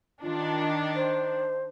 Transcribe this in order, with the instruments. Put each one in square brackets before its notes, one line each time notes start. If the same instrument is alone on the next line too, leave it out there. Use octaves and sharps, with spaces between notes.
[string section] D#3 D4 [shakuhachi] F4
[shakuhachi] C5